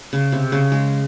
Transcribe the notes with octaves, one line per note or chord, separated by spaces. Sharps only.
C#3
C3
C#3
G#3